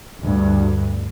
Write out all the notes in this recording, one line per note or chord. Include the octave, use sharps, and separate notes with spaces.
D2 G2